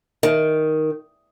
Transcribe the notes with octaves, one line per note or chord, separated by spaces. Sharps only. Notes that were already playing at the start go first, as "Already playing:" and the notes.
D#3